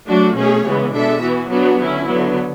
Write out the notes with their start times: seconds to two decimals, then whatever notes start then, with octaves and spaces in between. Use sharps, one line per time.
0.08 F#3 A3 D4 F#4
0.37 B2 A3 C#4 G#4 C#5
0.65 C#3 E3 G#3 B3
0.94 B2 G#3 D4 A4 E5
1.22 E3 B3 F#4
1.50 F#3 B3 D4 F#4
1.79 D3 F#3 C#4 E4
2.07 D3 F#3 B3